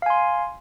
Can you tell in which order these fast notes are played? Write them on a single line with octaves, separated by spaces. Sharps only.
F5 G#5 C6